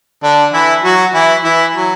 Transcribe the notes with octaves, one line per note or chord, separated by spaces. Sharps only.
D3 D4
E3 E4
F#3 F#4
E3 E4
E3 E4
F#3